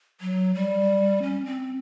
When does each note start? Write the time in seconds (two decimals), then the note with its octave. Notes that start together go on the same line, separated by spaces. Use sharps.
0.21 F#3
0.55 G3
1.23 C#4
1.45 C4